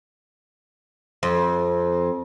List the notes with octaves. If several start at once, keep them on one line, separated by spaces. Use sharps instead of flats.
F2